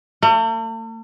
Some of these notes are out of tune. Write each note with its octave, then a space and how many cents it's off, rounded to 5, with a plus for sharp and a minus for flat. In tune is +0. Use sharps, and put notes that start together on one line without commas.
A3 +45